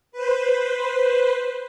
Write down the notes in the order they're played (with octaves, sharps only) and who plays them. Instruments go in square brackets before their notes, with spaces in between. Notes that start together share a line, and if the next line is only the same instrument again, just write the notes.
[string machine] B4 C5